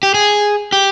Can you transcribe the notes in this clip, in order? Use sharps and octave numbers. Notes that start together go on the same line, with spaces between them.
G4
G#4
G4